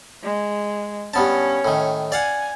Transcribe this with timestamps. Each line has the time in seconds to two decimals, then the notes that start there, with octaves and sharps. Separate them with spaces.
0.24 G#3
1.14 G2 B3 C#4 A5
1.65 A2 D#3
2.12 D5 F5 F#5 G#5